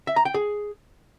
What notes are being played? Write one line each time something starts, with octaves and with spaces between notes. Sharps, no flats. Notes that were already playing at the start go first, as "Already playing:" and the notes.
E5
A#5
G5
G#4